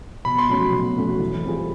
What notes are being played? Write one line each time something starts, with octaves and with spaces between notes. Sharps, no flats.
B2 B5
C6
F#3 A3 C#4 F#4 B5
B2
F#3 A3 C#4 F#4
E3
G3 C4 F4 G#4